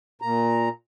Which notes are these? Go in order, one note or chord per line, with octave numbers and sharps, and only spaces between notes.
A#2 A#5